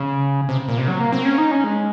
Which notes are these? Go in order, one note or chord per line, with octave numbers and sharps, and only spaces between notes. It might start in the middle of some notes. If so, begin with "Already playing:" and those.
Already playing: C#3
C3
A#2
C3
F#3
A#3
C4
C#4
D#4
C#4
G#3